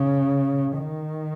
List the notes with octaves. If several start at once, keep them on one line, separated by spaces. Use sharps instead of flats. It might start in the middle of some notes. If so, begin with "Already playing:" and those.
Already playing: C#3
D#3